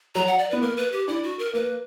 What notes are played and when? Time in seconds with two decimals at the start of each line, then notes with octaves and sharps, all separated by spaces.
0.15 F#3 A#5
0.27 F#5
0.38 D5
0.50 B3 B4
0.61 A#3 A#4
0.77 B4
0.92 G4
1.08 D4 E4
1.23 F#4
1.39 A#4
1.53 A#3 B4